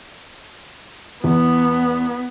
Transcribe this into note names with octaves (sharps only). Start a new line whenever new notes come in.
E2 B3